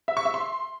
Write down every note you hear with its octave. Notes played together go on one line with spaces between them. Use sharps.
E5
C#6
E5
C6